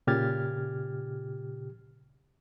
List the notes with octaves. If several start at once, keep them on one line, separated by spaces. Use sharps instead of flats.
A#2 C#3 G4 F6 G#6 A6